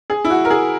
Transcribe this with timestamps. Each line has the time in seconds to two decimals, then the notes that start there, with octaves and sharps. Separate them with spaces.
0.10 G#4
0.25 E4
0.30 F#4
0.45 A#4
0.50 G#4